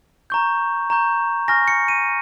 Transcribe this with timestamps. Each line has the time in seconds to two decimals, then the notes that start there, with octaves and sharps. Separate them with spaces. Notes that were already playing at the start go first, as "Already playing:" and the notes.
0.30 A#5 C#6 G6
0.90 A#5 C#6 G6
1.48 G#5 C#6 F6 A#6
1.68 C#7
1.88 D#7